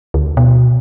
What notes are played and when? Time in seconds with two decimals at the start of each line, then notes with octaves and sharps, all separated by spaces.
0.14 D2
0.37 B2